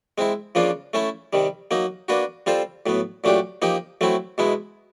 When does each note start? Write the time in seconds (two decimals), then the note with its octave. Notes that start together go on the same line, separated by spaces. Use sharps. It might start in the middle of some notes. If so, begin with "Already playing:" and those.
0.18 G#3 C4 E4
0.55 C#3 F3 A#3 D4 F4
0.93 A3 C#4 E4 A4
1.33 C3 D#3 G3
1.71 F#3 A#3 D#4
2.08 A#3 D4 F#4 B4
2.46 G3 C4 F4 A4 C5
2.86 A2 F#3 B3
3.24 A#2 F#3 A3 D4 G4
3.62 F3 A#3 D#4 G4
4.01 F#3 A3 C4 E4
4.38 B2 G#3 B3 E4